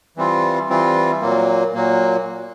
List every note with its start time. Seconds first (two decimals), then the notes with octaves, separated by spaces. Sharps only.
0.17 E3 G3 C4 F4
0.69 E3 G3 C4 F4
1.21 A#2 F#3 A#3
1.74 A#2 F#3 A#3